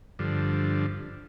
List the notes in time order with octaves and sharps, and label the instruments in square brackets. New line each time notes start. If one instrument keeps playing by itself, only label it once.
[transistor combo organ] G2 D3 F3